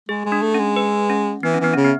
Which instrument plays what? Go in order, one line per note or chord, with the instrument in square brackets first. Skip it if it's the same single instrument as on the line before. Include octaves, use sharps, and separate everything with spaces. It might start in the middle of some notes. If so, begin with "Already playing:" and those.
[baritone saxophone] G#3 [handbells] G#4
[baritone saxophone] G#3
[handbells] D4
[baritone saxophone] A3
[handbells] C#4
[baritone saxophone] G#3
[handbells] B4
C#4
[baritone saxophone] E3 [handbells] B3
[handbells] C#4
[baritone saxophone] E3 [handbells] B3
[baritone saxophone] C#3 [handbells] C#4
[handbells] B3